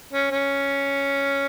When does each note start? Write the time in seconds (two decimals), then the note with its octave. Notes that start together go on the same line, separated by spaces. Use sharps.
0.13 C#4
0.31 C#4